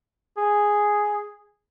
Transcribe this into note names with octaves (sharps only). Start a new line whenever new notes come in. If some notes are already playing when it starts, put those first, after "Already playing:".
G#4